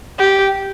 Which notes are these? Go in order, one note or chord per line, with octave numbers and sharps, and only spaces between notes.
G4